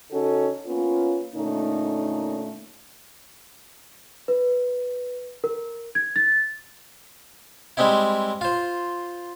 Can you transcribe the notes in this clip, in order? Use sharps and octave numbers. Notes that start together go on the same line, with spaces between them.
C#3 C#4 D#4 F#4 A4
A#3 B3 C#4 F4
A#2 D3 A3 A#3 C#4 D#4
B4
A#4
G#6
A6
G3 G#3 C4 D#4 E4
F4 C5